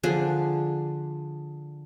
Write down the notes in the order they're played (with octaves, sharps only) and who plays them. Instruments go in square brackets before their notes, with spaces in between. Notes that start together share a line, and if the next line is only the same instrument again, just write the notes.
[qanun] D3 F3 D4 G#4